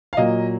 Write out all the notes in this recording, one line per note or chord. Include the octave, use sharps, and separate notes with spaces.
F5
A#2 F#3 A#3 D#5